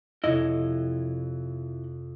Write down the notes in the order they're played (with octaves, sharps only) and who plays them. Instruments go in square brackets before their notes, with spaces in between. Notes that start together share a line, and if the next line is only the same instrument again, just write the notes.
[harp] F2 C3 C#5 [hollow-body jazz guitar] E4 D#5